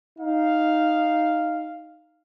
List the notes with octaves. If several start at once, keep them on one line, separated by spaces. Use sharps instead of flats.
D#4 F5